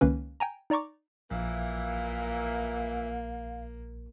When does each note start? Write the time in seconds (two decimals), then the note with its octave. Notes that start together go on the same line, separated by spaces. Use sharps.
0.01 C#2 D#3 A#3 C#4 B4
0.40 G5 G#5 A#5
0.70 D#4 D5 A#5 C#6 D6
1.31 A#1 A#2 E3 A#3 F5